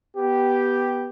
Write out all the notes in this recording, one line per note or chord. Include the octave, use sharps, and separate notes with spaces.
B3 G4